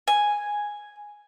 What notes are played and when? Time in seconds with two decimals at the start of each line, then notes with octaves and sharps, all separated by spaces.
0.08 G#5